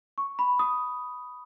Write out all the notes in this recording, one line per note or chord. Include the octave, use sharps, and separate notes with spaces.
C#6
B5
D#6